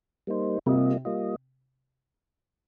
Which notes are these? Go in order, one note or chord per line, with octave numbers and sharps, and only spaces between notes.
G3 A#3 D#4 C5
C3 G3 A#3 F4 D#5
G3 A#3 F4 D#5